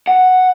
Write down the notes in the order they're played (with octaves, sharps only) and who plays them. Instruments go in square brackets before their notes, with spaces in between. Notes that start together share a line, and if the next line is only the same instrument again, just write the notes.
[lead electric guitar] F#5